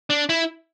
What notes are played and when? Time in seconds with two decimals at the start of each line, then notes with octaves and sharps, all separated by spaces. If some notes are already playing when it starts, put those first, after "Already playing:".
0.10 D4
0.29 E4